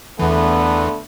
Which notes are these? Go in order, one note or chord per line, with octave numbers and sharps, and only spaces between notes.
E2 D3 E3 A3 B3